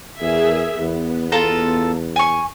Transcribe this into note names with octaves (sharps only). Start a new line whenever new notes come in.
E2 G#4 A#4 E5
E2 B3
F4 A4 A#5
G#5 C#6